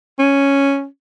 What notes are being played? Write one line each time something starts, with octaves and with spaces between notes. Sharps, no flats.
C#4